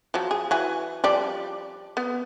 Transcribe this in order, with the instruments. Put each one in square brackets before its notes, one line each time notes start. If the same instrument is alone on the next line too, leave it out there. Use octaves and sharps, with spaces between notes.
[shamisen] F3 F#3
G#4
E3 F#4 G#5
F3 G3 D5
B3